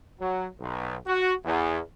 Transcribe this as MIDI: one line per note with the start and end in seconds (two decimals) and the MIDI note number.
0.20 0.46 54
0.60 0.96 35
1.07 1.33 66
1.45 1.80 40